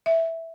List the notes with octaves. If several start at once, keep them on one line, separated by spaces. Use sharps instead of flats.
E5